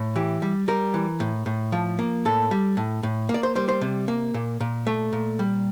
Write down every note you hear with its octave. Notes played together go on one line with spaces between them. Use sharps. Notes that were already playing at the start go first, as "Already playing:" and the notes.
Already playing: A2
E3 G4
G3
G3 A#4
E3
A2
A2
F3
A#3
A2 A4
G3
A2
A2
A#3
D5
C5
G3 C5
C5
C3
A#3
A#2
A#2
A3
A#2
G3